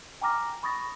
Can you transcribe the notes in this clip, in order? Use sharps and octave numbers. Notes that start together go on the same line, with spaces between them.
G5 G#5 A#5 D6 F6 A#6
B5 C#6 D#6 A6 A#6